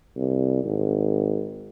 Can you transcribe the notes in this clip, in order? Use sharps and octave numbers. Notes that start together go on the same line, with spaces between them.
C2
G#1